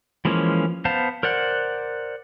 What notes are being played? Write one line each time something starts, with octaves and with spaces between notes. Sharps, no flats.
E3 F3 G#3 A#3 C#4
B3 C5 F5 A5
A#4 C5 D5 F#5